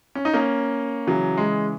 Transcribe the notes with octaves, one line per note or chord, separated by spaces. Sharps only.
C#4
D#4
A#3 C#4
C#3 E3 F#3
G#3